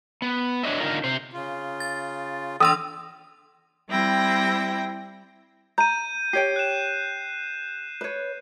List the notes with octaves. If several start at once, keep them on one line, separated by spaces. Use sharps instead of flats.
B3
F#3 D4 C#5 D#5 E5
D3 D#4 F4 A#4
C3 C5
C#3 F4
A6
E3 D4 D5 C6 D#6 E6
G3 C4 E4 G5 A#6
A#5 G6 D#7
G4 C#5 G5 C7
F#6 E7
B4 C#5